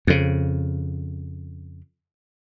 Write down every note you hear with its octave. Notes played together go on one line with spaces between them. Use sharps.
F2 C#3